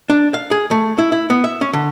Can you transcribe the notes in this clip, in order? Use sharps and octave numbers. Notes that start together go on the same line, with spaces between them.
D4
F5
G#4
A3
E4
E4
B3
E5
C#4
D3